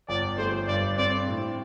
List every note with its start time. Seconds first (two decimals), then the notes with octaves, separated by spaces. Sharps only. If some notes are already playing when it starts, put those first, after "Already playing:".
0.09 G1 D5
0.37 A3 C5
0.67 G2 D5
0.97 C4 D5
1.28 A2